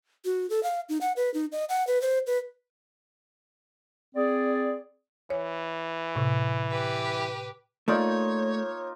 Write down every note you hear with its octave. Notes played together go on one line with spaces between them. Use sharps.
F#4
A4
F5
D#4
F#5
B4
D#4
D#5
F#5
B4
C5
B4
C4 G#4 D5
E3 C#5
A2 C3
G4 B4
A3 A#3 D#4 F4 C#5 D5